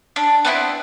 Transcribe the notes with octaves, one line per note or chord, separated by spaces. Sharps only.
D4
B3 C4 D4 E4